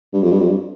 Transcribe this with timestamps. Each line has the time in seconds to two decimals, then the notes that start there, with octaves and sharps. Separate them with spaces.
0.14 G2
0.23 F2
0.32 G2
0.40 F2
0.48 G2